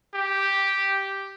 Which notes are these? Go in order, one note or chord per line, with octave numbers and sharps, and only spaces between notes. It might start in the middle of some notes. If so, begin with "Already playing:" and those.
G4